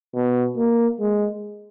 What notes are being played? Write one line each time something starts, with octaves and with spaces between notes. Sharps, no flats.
B2
A#3
G#3